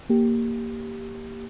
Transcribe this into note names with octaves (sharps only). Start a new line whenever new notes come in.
A#3 G4